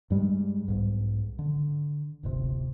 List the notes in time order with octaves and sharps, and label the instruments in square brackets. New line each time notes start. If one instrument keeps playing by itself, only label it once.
[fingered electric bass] G2 G3 G#3
B1 G#2
D3
D1 G1 C3